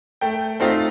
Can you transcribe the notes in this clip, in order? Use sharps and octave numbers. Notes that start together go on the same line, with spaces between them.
A3 G5
A3 C4 D#4 F4